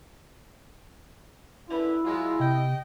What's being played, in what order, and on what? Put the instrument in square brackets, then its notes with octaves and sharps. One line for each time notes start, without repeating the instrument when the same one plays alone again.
[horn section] F#2 D3 B4 [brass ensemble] E4
[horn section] F#3 G#3 F4
[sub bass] C3 [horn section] D#5 G5